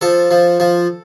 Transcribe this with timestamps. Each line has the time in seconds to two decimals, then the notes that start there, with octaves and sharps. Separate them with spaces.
0.01 F3 A4
0.31 F3
0.60 F3